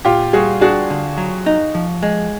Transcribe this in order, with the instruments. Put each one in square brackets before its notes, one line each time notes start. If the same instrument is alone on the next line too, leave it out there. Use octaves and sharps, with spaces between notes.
[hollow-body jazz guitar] A#2 [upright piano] F4 G4
[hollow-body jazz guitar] G3 [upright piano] F#4 G#4
[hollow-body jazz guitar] D4 [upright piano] F#4 G#4
[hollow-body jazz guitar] D3
F#3
D#4
F3
G#3